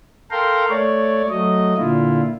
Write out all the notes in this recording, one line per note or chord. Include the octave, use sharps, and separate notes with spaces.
A4 A#4 F5 G5 A#5 C6
A3 C#5 D5
F#3 A3 D#5
A#2 D3 E4 F4